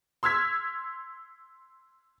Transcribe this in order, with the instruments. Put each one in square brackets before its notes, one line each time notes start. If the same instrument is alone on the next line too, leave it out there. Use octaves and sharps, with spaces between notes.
[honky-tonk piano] C6 E6 F6 G#6 B6